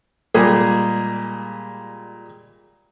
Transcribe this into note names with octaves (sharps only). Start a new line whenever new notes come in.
A#2 G3 G#3 G4 G#4